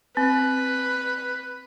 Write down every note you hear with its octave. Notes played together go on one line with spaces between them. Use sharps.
C4 B4